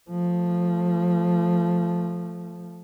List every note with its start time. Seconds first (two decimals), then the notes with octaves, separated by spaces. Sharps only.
0.11 F3 A3